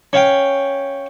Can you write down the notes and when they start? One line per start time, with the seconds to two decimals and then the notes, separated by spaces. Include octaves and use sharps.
0.13 C#4 F5 G5